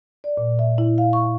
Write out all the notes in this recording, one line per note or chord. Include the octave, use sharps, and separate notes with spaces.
D5
A#2
E5
E4
F5
C#6